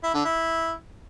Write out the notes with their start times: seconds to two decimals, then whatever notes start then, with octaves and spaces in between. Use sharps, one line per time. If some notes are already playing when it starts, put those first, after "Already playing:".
0.04 E4
0.14 D3
0.25 E4